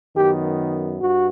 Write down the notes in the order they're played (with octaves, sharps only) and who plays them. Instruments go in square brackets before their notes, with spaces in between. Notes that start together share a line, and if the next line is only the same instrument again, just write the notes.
[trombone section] F#2 D#3 F#3 B3 G4
G2 F#4